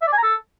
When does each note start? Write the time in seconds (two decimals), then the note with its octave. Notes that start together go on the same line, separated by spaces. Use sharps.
0.02 E5
0.07 D5
0.12 G#5
0.18 A#5
0.23 A4